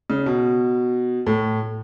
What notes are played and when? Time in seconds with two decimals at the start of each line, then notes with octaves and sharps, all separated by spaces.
0.10 C#3
0.26 B2
1.27 A2